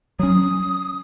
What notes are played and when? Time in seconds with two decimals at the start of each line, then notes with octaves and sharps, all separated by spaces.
0.19 F#3 C#4 D#6